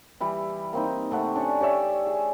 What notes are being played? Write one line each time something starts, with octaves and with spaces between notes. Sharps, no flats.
E3 G3 E4
A#3 C4 D#4
C3 A3 F#5
C#4 D4 C#6
G4 C#5 D5 E5
G#4